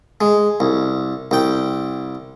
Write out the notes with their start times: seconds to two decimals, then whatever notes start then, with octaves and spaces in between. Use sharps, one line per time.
0.21 G#3
0.60 C2
1.31 C2 G5